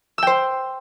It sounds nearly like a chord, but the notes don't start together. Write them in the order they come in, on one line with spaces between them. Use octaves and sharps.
E6 G5 C5